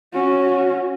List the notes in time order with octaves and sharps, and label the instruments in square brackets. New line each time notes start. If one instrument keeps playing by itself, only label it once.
[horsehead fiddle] C#4 F#4